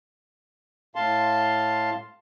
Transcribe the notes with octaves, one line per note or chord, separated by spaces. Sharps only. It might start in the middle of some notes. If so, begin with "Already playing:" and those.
A2 F5 A5 C6